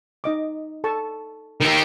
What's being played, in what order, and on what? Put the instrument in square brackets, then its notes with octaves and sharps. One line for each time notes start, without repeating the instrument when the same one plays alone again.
[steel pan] D#4 D#5 D6
A4 A5 C#6
[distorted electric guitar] D#3 G4 [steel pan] A#4